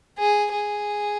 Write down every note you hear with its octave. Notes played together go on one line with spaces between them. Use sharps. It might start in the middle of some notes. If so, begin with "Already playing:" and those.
G#4
G#4